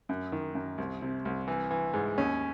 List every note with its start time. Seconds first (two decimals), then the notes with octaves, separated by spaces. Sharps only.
0.09 F#2
0.32 D#3
0.55 F#2
0.78 C2
1.02 C3
1.25 C2
1.48 E3
1.71 E3
1.94 G#2
2.18 D#2 C#4